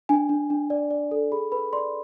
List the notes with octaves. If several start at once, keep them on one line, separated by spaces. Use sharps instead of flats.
D4 G#5
D4
D4
D5
D5
A4
G#4 B5
B4 B5
D5 C6